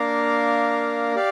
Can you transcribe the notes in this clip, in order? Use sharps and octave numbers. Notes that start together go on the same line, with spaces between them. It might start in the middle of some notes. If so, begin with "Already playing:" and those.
Already playing: A#3 D4 A#4 F5
G4 D5 F5